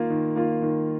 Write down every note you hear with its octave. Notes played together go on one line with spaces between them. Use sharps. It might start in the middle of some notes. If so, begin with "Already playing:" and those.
Already playing: D#3 A#3 F4
D#3
A#3 F4
D#3